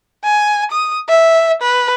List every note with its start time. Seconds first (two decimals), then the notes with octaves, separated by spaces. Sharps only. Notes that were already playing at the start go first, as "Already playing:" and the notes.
0.24 G#5
0.71 D#6
1.09 E5
1.62 B4